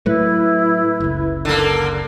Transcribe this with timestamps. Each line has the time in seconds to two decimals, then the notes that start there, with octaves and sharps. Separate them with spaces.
0.06 A2 F#3 A3 E4 B4
1.00 F#1 C#2
1.45 D3 A#3 A4